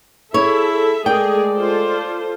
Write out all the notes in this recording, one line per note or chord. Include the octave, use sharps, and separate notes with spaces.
E4 G#4 A4 C#5 E5
G#3 A3 G#4 A#4 D5 G5
F4 A4 C5